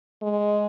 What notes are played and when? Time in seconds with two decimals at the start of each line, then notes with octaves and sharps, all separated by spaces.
0.22 G#3